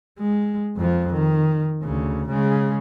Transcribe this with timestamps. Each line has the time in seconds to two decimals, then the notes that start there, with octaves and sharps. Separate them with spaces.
0.19 G#3
0.77 F2 F3
1.13 D#3
1.82 D2 C#3
2.28 C#3 G#3